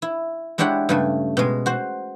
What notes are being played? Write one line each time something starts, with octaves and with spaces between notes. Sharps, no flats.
E4
G#3 D4 E4 G4 C#5 F#5
G2 C#3 A3
B2 G#3
F#4 C5